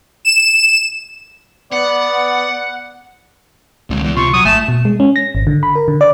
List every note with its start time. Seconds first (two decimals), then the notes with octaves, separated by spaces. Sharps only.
0.25 E7
1.72 B3 D5 F#5
3.90 C#2 D3 G#3
4.03 E3 B3
4.16 C3 F4 C#6
4.34 F#3 D#6
4.45 G#1 A3 G#5 A5 E7
4.68 B2
4.85 G#3
5.00 C#4
5.16 A#6
5.35 G#1
5.47 D3
5.63 B5
5.75 A#4
5.88 D3
6.01 D5